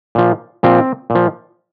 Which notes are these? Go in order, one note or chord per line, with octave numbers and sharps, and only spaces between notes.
A#2 F3
A#2 F3 C4
A#2
F3